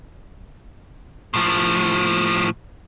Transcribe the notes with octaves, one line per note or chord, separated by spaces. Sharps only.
A2 F3